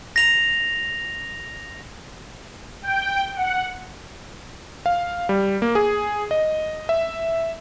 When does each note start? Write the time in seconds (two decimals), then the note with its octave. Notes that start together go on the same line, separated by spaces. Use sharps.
0.16 A#6 F7
2.82 G5
3.36 F#5
4.86 F5
5.29 G3
5.62 A#3
5.75 G#4
6.31 D#5
6.89 E5